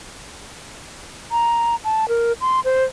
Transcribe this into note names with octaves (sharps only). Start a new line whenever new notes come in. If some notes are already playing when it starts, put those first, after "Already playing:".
A#5
A5
A#4
C6
C5